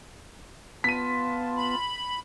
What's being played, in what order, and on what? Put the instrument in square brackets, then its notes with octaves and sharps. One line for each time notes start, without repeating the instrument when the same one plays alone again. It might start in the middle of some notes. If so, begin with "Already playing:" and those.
[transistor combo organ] B3 [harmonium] F4 A5 [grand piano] B6 D#7
[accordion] B5